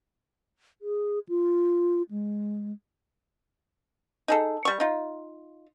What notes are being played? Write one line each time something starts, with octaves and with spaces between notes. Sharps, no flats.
G#4
F4
G#3
D#4 G#4 A4
G3 C#6
D#4 F4